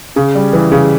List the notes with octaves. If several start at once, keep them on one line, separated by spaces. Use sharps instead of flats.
C#3
G3
E3
C#3